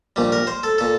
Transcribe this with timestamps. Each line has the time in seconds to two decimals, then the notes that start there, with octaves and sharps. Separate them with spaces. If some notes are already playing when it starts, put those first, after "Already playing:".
0.16 A#1 A#2 G3
0.32 A#4
0.47 C5
0.63 A4
0.78 A#2 A4